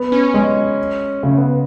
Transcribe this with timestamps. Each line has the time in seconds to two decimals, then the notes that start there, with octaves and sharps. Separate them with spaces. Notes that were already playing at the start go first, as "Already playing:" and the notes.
Already playing: B3
0.12 C#4
0.34 G#3
1.23 C#3 A3
1.38 B3